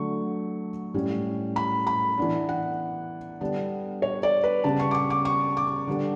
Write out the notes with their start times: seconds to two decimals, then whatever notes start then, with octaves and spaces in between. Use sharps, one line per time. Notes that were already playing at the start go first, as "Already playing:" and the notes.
Already playing: D3 F#3 A3 C#6
0.94 A2 G3 C#4
1.56 B5
1.87 B5
2.18 E3 B3 D4
2.49 F#5
3.41 D3 G3 B3 D4
4.02 C#5
4.23 D5
4.44 B4
4.64 C#3 G3 B3 A5
4.79 C#6
4.91 D6
4.94 C#6
5.10 D6
5.25 C#6
5.57 D6
5.87 D3 G3 B3 D4